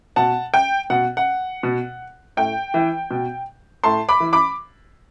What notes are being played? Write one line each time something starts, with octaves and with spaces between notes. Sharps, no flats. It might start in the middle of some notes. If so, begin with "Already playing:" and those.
B2 F#5 A5
G5
B2 F#5
F#5
B2
A2 G5
E3
B2
A2 A5 C6
B5 D6
E3
B5 D6